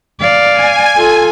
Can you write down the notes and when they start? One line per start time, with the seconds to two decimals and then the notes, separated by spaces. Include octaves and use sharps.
0.21 D5 F5
0.52 G#5
0.97 F4 A4